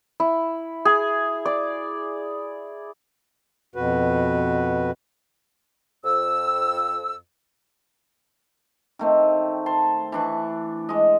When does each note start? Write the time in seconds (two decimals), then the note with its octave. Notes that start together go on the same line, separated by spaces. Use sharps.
0.20 E4
0.85 G#4
1.45 D5
3.76 F2 B2 F#4 B4
6.04 F2 E6
8.99 D#3 A3 C4
9.66 A5 C6
10.12 E3 D4 C#6
10.89 G#3 D#5